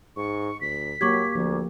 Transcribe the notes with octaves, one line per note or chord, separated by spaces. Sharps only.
G#2 C#6
D2 B6
F#3 A#3 G4 C#6 D6 G#6
D2 F3 A#3